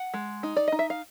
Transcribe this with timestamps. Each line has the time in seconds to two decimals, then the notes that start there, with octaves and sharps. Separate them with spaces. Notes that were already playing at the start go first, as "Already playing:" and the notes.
Already playing: F#5
0.14 G#3
0.43 D#4
0.57 D5
0.68 D#4 D#5
0.79 E5
0.90 F5